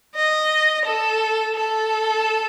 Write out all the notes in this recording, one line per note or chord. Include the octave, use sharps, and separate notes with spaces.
D#5
A4
A4